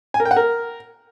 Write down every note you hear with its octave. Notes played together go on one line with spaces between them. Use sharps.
G#5
A#4
G5
F#5
A#4